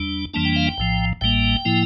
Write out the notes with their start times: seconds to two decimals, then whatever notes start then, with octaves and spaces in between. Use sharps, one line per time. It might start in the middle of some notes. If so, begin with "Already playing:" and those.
Already playing: E2 G3 D4
0.34 F2 E3 G3 A#3 D4 A5
0.45 G5
0.56 F5
0.67 G5
0.78 A#1 A2 F3
1.21 A1 A2 G3 A#3 G5
1.65 A2 F3 A#3 E4